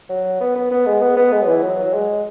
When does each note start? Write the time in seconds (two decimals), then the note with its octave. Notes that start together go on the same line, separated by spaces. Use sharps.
0.09 F#3
0.40 B3
0.56 B3
0.71 B3
0.86 G#3
1.01 B3
1.16 B3
1.32 G#3
1.42 F#3
1.47 E3
1.62 F#3
1.83 F#3
1.93 G#3